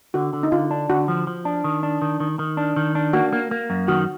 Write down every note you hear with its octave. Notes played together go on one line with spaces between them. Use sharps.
D3 F#4
D3
D#4
D3 F4
D4
D3 F#4
F3
F3
D4
D#3
D4
D#3
D#3
D#3
D4
D#3
D4
A#3 F#4
A#3
A#3
F#2
D#3 F#4